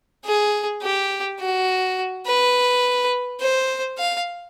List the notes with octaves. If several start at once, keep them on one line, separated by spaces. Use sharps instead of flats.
G#4
G4
F#4
B4
C5
F5